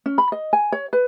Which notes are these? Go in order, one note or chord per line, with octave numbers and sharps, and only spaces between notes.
C#4
B5
D#5
G#5
C#5
B4